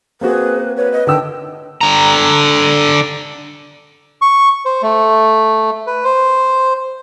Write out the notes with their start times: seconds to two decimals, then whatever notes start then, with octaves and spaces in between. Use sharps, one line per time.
0.21 A#3 C4 F#4 G#4 B4
0.77 B4 C#5
0.92 D#5
1.07 D3 D#3 G5 E6
1.81 D3 A#5
4.22 C#6
4.65 C5
4.82 A3
5.87 B4
6.04 C5